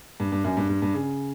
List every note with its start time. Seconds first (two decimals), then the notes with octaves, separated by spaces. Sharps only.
0.20 G2
0.32 G2
0.44 F#2
0.57 G2
0.69 G2
0.82 G2
0.94 C#3